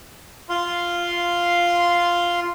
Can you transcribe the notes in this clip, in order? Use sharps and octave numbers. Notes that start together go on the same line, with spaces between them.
F4 F5 C6